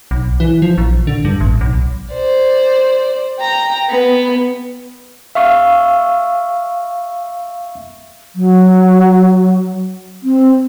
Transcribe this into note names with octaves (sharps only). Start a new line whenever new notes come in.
B1
E3
F3
A#1
D3
G2
A1
B1
C5 D5
G5 A#5
B3
E5 F5 C#6 E6
F#3
C4